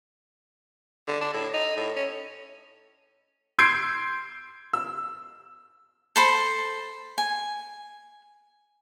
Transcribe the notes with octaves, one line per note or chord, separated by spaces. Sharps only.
D3
D4
A2
D#4
A2
C#4
C6 E6 G6 G#6 C7 D7
E6
A4 C5 B5
G#5